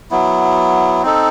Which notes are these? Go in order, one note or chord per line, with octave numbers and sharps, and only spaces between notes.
F#3 B3 E4
C4 D#4 A4